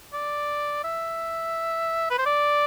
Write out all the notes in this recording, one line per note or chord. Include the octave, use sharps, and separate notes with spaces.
D5
E5
B4
C5
D5